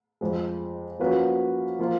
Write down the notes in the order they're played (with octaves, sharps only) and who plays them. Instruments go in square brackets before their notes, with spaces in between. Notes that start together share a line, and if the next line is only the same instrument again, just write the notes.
[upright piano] F2 F3 G#3
F3 A#3 C#4 F#4 B4
F3 A#3 F4